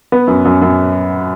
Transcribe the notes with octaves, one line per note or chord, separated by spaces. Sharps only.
B3
F#2
F#2
F#2